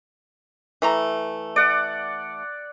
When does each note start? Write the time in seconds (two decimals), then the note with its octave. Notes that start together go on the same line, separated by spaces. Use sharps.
0.82 E3 A3 A#5
1.56 D5 F#5